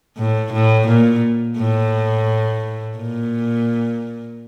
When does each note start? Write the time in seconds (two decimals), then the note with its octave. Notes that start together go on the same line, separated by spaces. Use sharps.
0.17 A2
0.52 A2
0.87 A#2
1.58 A2
2.97 A#2